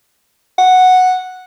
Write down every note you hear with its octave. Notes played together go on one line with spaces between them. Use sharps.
F#5